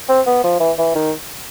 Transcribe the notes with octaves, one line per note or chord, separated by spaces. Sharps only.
C4
B3
F3
E3
E3
D#3